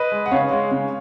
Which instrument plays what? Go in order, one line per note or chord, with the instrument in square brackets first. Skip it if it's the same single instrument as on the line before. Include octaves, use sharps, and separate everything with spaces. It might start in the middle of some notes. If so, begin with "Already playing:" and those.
Already playing: [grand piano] B4 D#5
G#3
F#5
C#3 C#5 F5
G#3
C#3